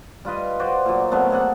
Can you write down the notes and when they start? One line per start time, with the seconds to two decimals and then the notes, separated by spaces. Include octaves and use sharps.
0.25 G3 F4 B4 D#5
0.59 F#4 C5 D5
0.85 A#2 F#3
1.12 C3 F#3 A3 B3
1.30 A#3 G#4 A4 F#5